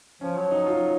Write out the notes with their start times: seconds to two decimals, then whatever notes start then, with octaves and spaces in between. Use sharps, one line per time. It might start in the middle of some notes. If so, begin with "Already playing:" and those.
0.21 F3 C#4
0.36 F#3
0.51 D#4
0.66 F4